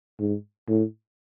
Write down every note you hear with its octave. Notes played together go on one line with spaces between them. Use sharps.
G#2
A2